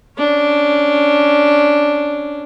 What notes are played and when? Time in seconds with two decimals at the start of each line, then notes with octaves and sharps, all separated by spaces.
0.18 C#4 D4